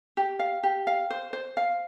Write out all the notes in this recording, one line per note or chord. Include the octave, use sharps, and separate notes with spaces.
G4
F5
G4
F5
C5
C5
F5